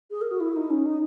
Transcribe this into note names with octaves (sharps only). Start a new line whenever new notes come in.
G#4
A#4
F#4
E4
D#4
C#4
D#4